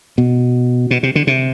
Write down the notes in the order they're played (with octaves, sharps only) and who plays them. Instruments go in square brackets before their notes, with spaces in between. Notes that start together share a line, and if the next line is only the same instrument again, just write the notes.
[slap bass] B2
B2
C3
D3
C3